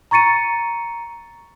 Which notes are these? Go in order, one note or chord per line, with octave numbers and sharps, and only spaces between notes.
A#5 C#6 A6 C#7 D#7